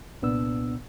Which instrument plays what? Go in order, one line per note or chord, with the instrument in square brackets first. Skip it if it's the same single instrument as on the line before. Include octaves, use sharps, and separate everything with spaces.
[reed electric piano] C2 A#2 B3 D4 E6